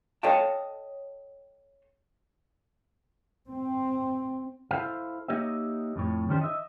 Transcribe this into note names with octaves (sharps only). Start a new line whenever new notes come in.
A4 C#5 D#5 F5 G5 A5
C4
E4 A4 C5 E5 F5
A#3 D#4 G4 C#5 D#5 E5
F2 A2 C#5
D#3 E3 C#4 D4 G4 C5
D#5 E5